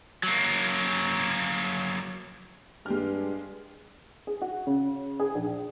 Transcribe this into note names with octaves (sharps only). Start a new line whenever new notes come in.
F#3 A#3
G2 G#3 G4 F6
G#4
F#4
C#3
G#4
A#1